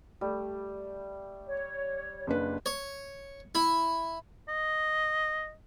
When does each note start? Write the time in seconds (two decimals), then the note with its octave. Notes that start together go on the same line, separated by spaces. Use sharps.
0.21 G3 A3
1.47 C#5
2.27 F#1 D4 B4
2.66 C#5
3.55 E4
4.49 D#5